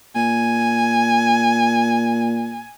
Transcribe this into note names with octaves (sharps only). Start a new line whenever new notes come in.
A#2 G#5